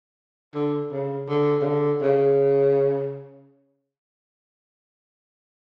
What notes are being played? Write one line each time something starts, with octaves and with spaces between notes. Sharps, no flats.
D3
C#3
D3
C#3
D3
C#3